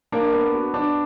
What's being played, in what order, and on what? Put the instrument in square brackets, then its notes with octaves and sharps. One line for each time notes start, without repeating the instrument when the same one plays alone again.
[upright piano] A#3 A#4 [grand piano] D4
[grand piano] B3
F#4
D4